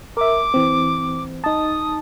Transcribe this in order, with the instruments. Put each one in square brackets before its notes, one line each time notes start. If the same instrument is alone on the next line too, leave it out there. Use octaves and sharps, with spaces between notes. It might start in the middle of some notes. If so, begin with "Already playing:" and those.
[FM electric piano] A#4 E5 [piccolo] D6
[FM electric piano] E3 C4
[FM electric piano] D#4 A5 [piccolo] D#6